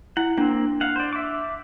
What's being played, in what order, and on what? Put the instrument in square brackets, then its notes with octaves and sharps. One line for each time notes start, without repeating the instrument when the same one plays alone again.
[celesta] E4 [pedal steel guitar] F#5
[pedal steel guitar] A#3 C4 [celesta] D4
[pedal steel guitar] F5 F#5
C5 D5
E5 D6